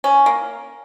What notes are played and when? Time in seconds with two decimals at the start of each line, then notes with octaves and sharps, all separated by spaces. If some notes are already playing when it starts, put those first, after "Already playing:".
0.04 C#4
0.26 A#3